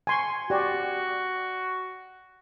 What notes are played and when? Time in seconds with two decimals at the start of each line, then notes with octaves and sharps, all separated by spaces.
0.07 G#5 C6 C#6
0.50 F#4 G4 D5